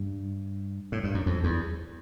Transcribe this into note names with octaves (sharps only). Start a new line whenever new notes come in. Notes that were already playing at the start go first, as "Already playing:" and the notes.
Already playing: G2
A2
G2
F#2
F2
E2